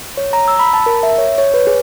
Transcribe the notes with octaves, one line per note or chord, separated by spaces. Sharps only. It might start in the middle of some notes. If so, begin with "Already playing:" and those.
C#5
A#5
E6
B5
A5
A#4
E5
C#5
C#5
B4
G#4